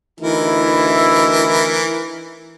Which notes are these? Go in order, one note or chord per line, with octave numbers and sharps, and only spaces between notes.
D2 E3 D#4 E4 A#4